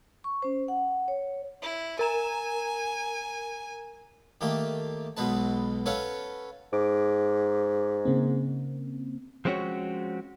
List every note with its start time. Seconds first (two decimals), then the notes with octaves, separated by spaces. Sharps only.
0.24 C#6
0.42 C#4 C5
0.68 F#5
1.08 C#5
1.62 E4
1.99 A#4 G#5 A#5 E7
4.41 D#3 A3 A#3 G4
5.17 B1 B2 G#3 B4 A5
5.86 C#4 A4 B4 C#5 F5 F#5
6.73 G#2 D6
8.05 C#3 A#3 C4
9.45 F3 G#3 C4 C#4 F#4 C#5